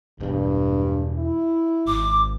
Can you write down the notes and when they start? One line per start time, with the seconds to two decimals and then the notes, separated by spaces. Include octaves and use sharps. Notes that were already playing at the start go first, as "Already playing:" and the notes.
0.20 E1 E2 G2
1.15 E4
1.87 G#1 D6